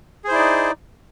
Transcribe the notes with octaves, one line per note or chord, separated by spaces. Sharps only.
D#4 E4 G#4 C5 D5